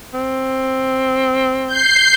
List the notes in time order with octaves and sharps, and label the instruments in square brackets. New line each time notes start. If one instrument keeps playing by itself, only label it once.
[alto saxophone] C4
[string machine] G6 C7